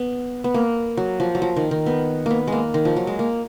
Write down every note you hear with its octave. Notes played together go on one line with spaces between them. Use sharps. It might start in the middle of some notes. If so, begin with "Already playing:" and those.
Already playing: B3
B3
A#3
F#3
F3
F#3
F3
D#3
D#3
B3
A#3 B3
G#3 A#3
D#3
F3
F#3
G#3
A#3